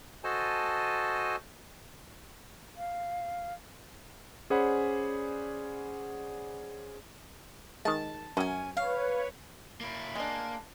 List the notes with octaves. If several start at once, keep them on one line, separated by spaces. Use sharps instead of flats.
F#4 A4 C5 D#5 G#5 A5
F5
C#4 G#4 C5 D5 F#5 B5
D#3 G#3 A5
F#2 C#4 G#5
B4 C#5 F5
A#3 E4
G#3 A#3 D4